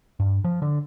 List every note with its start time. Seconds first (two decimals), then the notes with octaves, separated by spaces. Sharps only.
0.20 G2
0.44 F3
0.62 D3